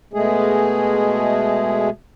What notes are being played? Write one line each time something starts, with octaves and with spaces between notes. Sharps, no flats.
B2 G#3 A3 G#4